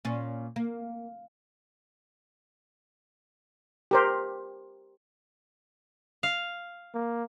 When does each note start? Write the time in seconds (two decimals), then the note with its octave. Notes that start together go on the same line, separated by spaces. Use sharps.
0.05 A#2 C#4
0.56 A#3
3.91 G4 A#4 C5
6.23 F5
6.94 A#3